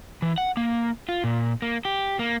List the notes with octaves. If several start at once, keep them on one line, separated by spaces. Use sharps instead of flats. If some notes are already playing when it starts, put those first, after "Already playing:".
E3
F#5
A#3
F4
A#2
A#3
G4
A#3